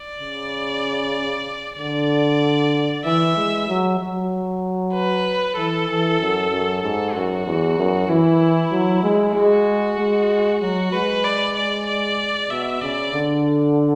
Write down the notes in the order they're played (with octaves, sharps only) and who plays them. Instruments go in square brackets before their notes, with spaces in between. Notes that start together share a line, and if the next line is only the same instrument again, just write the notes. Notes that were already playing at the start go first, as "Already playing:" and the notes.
Already playing: [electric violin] D5
[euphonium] C#3
[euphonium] D3 [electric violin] D5
[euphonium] E3 [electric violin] E5
[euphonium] G#3
F#3
F#3
[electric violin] B4
[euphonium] E3 [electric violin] A4
[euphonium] E3
F#2
F#2
[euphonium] G#2 [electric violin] A4
[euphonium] F#2 [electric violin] F#4
[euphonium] E2
F#2
[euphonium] E3 [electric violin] E4
[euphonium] F#3
G#3
[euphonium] G#3 [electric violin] F#4
[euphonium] G#3
[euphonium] F#3 [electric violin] F#4
[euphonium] G#3 [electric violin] B4
[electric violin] D5
D5
D5
[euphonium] B2 [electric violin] E5
[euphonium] C#3 [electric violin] D5
[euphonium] D3